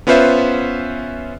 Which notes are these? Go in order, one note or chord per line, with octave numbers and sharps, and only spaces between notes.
B3 C#4 F4 B4 C5 E5